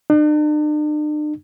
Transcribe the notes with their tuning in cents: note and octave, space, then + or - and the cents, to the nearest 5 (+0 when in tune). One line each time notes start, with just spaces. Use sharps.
D4 +45